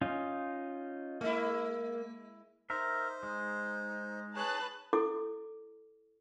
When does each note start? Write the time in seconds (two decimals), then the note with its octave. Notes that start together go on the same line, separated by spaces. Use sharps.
0.01 C#4 D#4 F4
1.21 G#3 A#3 E4
2.70 D#4 A#4 C5 E5
3.23 G#3
4.36 G#4 B4 C#5 A5 F#6
4.93 E4 A4 D6